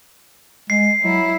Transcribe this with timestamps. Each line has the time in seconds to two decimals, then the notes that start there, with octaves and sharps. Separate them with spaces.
0.70 G#3 C7
1.04 F#3 E4